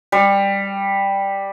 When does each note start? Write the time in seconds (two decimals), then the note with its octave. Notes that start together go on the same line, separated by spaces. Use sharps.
0.12 G3